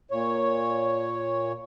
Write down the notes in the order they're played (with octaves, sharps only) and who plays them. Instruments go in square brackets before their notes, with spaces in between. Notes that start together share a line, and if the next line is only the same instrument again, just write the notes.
[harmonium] A#2 C#5